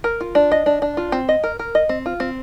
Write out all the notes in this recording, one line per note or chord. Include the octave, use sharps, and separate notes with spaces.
A#4
F4
D4
D#5
D4
D4
F4
C4
D#5
A#4
A#4
D#5
C4
F4
C4